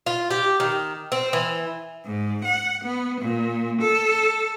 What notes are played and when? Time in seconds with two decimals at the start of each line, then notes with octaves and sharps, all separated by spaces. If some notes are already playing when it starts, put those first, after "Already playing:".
0.06 F4
0.31 G4
0.60 D#3
1.12 C4
1.33 E3
2.05 G#2
2.45 F#5
2.84 B3
3.20 A#2
3.81 A4